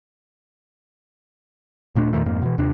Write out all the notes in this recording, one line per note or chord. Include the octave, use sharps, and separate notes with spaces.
D#1 A#2 A3 D4
E2 A#2 D#3 A3
F2 G#2 A#3
B2 E3
D#2 C3 D4